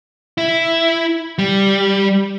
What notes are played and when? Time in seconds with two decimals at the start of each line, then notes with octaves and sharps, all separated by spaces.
0.38 E4
1.38 G3